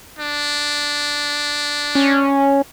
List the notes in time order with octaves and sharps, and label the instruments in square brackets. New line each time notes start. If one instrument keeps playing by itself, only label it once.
[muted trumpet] D4
[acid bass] C#4